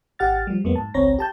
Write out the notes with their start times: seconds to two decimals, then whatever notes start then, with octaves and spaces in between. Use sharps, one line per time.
0.19 G#1 G4 F#5 F6 A6
0.47 F3 G3
0.64 F2 F#3 G#3 A#3 B3
0.76 G#2 A5
0.94 G#1 C#2 C4 C#5 A#5 A#6
1.19 G4 A5 G6